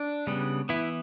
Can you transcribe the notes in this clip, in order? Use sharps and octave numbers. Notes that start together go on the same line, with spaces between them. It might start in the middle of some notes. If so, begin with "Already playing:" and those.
Already playing: D4
C#3 G3 B3
E3 B3 E4